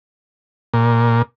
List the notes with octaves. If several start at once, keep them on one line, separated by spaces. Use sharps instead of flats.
A#2